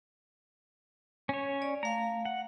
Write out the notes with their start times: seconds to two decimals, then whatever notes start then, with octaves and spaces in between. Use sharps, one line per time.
1.29 C#4 C#5
1.62 D5
1.83 A3 F5 A#5
2.25 F#5